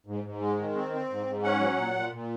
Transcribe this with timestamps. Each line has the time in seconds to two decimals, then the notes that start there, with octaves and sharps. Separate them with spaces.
0.07 G#2
0.24 G#2
0.40 G#3
0.58 D#3
0.75 C4
0.92 C4
1.10 G#2
1.27 G#2
1.43 C#4 F#5
1.60 F#3
1.77 A#2
1.94 A#2
2.12 A#2